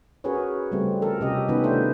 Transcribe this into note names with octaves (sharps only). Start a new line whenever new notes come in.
C#4 F#4 G#4 A#4 B4 C#5
C#3 G3 A3 C4
F3 A4 A#4
C3 C#4 G4 D#5
D#3 F3 B3 C#4 D#4 B4
A3 D4 A4 C5